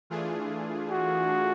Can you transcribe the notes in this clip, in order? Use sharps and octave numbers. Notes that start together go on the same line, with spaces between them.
E3 A3 D4 F4 G#4
F#4